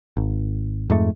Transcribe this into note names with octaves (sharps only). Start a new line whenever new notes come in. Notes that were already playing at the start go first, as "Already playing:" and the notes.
G#1
F2 G#2 A3